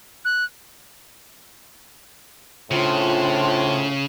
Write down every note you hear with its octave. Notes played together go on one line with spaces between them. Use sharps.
F#6
A2 C#3 C4 D4 F4